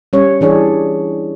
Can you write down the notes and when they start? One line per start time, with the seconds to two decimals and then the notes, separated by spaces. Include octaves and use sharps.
0.13 G3 C#4 C#5
0.41 E3 D4 G#4 C#5